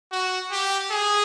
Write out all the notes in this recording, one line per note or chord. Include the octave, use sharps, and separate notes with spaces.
F#4
G4
G#4